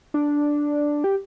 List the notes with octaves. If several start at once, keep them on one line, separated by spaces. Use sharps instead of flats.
D4
G4